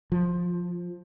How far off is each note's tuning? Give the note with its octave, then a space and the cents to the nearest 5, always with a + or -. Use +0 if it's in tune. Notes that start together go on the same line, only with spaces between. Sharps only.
F3 +10